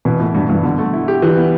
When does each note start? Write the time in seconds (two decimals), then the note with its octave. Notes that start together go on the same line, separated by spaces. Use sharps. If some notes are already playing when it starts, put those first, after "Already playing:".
0.05 B2 E3
0.20 A2 B3
0.34 G2 F#4
0.49 G2 E3
0.63 B2 D3
0.78 A3
0.93 E4
1.08 G4
1.22 E3 G3
1.37 B3